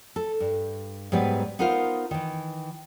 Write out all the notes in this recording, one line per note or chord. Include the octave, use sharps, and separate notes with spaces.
A4
G2
G#2 F#3 G3 B3 B4
B3 D#4 F4 A#4 C5 F5
D#3 E3